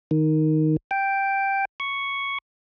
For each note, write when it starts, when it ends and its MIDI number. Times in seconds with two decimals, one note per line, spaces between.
0.11 0.77 51
0.91 1.65 79
1.80 2.38 85